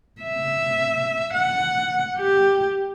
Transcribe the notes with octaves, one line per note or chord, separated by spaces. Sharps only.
E5
F#5
G4